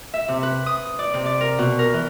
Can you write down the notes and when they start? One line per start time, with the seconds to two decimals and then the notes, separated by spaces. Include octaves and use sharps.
0.14 E5
0.28 C3
0.43 B4
0.66 D#6
0.99 D5
1.14 C3
1.26 D5
1.41 A#4
1.59 B2
1.79 A#4
1.93 E3